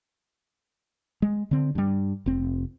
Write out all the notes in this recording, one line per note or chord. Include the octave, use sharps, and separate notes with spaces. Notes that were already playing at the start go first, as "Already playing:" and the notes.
G#3
D3 C4
G2 G3
F1 C4